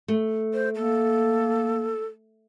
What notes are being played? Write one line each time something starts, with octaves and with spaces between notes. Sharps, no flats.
A3
C5
A#3 A4